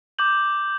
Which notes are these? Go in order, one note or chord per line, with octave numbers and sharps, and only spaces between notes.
D6 G6 F#7